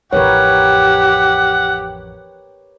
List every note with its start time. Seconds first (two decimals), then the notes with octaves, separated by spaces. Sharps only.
0.13 A1 F2 G4 A#4 B4 C#5 F#5